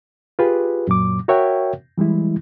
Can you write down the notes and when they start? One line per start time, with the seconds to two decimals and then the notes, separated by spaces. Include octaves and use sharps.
0.39 F4 G4 G#4 B4
0.87 F#2 A#2 F#3 D6
1.28 F#4 A#4 C#5 E5 F#5 G5
1.98 E3 G3 G#3 E4